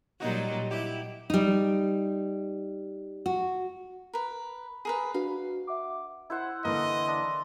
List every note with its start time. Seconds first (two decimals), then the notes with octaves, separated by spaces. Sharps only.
0.20 A#2 F#3 G3 D#4 F#4
0.71 E4 G4
1.30 G3 D#4
3.26 F#4
4.13 A#4 B4
4.85 G#4 A#4 B4
5.14 D4 F#4 B4 F5
5.67 E5 F#5 D6
6.30 E4 C5 F#5
6.65 D3 E3 A#3 A#4 D#5 C6
7.08 D4